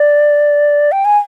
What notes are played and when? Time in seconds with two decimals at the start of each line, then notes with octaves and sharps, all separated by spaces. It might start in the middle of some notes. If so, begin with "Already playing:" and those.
Already playing: D5
0.92 G5
1.05 G#5